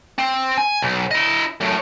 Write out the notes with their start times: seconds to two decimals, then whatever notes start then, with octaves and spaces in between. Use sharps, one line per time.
0.18 C4
0.57 G#5
0.82 B1
1.11 E4 D#5
1.61 F#2 A2